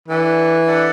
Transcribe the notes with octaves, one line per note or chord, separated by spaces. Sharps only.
E3 D4 A4 D5 F#5
D4 A4 D5 F#5